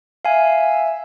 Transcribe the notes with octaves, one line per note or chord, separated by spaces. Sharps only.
E5 F5 G#5